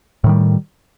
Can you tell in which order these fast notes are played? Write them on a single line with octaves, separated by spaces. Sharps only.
A2 D#3 G3